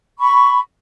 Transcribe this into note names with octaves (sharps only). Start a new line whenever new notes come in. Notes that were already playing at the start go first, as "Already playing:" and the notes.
B5 C#6